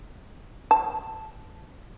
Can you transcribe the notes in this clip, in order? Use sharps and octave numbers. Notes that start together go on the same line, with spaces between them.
A5